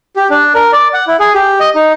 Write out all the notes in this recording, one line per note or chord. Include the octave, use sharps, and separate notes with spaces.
G4
D4
A#4
D5
F#5
E4
G#4
G4
D#5
D#4